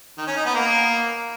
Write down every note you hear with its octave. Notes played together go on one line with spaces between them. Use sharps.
D#3
C#4
D#4
B3
A#3